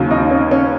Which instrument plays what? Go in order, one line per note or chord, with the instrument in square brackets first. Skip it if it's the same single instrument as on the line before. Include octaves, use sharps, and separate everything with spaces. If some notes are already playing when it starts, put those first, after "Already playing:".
Already playing: [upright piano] D#2 C#3 F#3
D#4
C#4
C#4